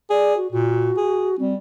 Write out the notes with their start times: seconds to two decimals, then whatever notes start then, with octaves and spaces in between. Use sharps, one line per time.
0.10 G#4 D5
0.37 F#4
0.52 A#2 F#4
0.97 G#4
1.39 G3 C4